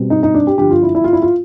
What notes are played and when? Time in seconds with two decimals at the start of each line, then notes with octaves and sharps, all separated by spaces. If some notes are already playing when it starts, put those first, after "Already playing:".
Already playing: B2 G3 C4
0.10 D#4
0.23 D#4
0.34 D4
0.47 G4
0.58 G2 D3 F3 G4
0.71 F4
0.82 E4
0.95 E4
1.04 F4
1.13 E4
1.22 F4